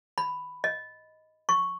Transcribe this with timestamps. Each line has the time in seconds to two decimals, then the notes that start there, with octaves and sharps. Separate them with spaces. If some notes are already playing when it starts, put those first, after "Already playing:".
0.18 B5
0.64 D#5
1.49 C#6